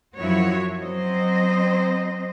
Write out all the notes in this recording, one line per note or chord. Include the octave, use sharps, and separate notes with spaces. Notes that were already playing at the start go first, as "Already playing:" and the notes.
F#2 F3 E4 F#4 C#5
F#3 C4 C5 D#5